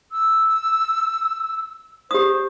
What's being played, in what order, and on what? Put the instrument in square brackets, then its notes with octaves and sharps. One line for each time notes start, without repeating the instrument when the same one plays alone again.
[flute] E6
[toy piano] G4 D#6 [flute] C5